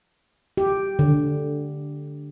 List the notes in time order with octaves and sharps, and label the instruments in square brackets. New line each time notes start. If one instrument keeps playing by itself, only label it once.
[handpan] G4
D3